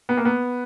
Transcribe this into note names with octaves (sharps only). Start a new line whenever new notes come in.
B3
A#3
B3